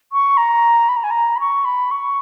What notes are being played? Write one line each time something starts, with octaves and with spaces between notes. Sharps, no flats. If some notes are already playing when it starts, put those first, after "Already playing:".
C#6
A#5
B5
A#5
G#5
A#5
B5
C#6
B5
C#6